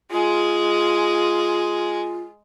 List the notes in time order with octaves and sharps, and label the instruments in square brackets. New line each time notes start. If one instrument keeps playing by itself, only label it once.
[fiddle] G#3 G#4 [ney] F4